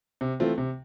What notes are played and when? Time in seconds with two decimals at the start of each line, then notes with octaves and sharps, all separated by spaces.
0.21 C3
0.40 E3 A3 C4 F4
0.58 C3